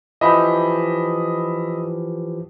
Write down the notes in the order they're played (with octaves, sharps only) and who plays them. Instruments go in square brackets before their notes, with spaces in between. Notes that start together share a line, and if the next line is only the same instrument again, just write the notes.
[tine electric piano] E3 F3 G4 [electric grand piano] D#5 E5 B5